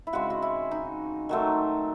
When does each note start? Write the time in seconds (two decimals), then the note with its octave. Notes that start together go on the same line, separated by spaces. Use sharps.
0.07 E4
0.13 C#3 G#3 C4 F#4
0.30 F#4
0.42 E4
0.71 D#4
1.29 D#3 F#3 A3 C4